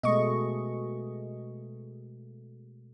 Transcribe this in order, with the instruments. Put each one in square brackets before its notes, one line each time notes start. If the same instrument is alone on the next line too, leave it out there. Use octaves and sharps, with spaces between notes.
[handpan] B2 G#3 A3 [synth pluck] D#5 C#6